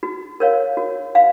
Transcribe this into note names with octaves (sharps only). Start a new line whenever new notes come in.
F#4
A#4 C#5 F5
F#4
F5